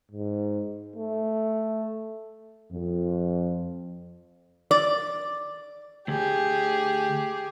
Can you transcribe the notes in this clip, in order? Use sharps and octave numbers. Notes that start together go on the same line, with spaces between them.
G#2
A3
F2
D5
D2 G4 G#4